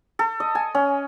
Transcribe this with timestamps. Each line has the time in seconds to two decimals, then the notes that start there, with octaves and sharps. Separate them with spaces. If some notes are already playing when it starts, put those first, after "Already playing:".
0.19 A4
0.40 D#5
0.55 G#5
0.75 C#4